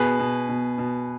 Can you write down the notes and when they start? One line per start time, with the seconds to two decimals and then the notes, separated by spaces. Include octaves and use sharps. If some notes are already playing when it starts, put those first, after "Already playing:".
Already playing: B2 G#4 B4
0.19 B2
0.49 B2
0.78 B2